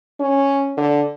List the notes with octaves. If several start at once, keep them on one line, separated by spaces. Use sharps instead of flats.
C#4
D3